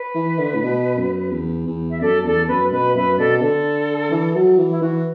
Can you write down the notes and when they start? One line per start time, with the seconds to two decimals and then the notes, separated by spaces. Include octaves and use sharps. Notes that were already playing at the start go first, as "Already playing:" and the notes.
Already playing: B4
0.15 E3
0.39 D3
0.55 A2
0.62 B2
0.98 F#2
1.32 E2
1.67 E2
1.91 E5
2.02 F#2 A4 D5
2.25 E2 A4 D5
2.48 F#2 B4
2.73 B2 B4
2.96 F#2 B4 E5
3.18 B2 A4 D5
3.42 D3 A4
4.11 E3
4.36 F#3
4.58 E3
4.70 E4
4.82 E3 F#4